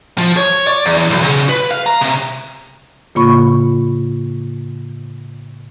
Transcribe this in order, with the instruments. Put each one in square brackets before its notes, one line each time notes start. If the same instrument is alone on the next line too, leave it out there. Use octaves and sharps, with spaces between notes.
[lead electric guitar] F3
C#5
D5
E2
B1
C#3
B4
F5
A#5
C3
[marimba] A2 C#3 A#3 F4 B5 C#6